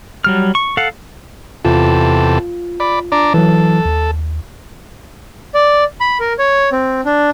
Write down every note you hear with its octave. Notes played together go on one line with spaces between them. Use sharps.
F#3 G3 F6
C#6
A4 F5 F#5
E2 C3 F4 A4
D5 B5
D4 D5 A#5
E3 F#3 A4
D#2
D5
B5
A#4
C#5
C4
D4